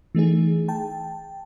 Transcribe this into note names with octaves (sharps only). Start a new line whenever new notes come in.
E3 A3 D#4 G#4
G5 A5